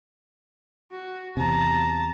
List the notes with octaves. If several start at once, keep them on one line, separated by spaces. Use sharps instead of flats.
F#4
E2 C3 A5 A#5